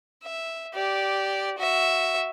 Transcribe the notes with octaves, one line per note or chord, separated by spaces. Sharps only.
E5
G4 D5
F#4 E5